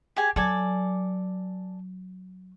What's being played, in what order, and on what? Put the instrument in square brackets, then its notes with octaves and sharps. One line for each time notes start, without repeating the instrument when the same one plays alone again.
[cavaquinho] G4 G#4 G#5
[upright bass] F#3 [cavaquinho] A4 D5 G#5